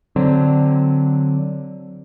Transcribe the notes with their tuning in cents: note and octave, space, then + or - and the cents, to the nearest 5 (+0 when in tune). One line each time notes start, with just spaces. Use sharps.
D3 +0 F#3 +0 C4 +0